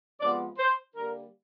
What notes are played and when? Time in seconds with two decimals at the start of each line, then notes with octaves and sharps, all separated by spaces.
0.19 C3 F3 G#3 B3 D5
0.57 C5
0.95 D3 G3 A#3 A#4